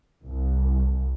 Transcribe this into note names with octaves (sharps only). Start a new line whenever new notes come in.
C2